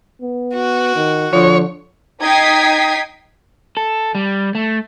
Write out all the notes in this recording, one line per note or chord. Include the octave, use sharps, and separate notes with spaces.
B3
F#4
D#3
D3 F3 C#5
D#4 G5 D#6 G#6 B6 C7
A4
G3
A3